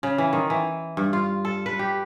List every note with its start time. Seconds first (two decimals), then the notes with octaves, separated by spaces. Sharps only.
0.03 C#3
0.18 E3
0.33 D#3
0.50 E3
0.97 G2
1.13 F4
1.45 A4
1.66 B4
1.79 G4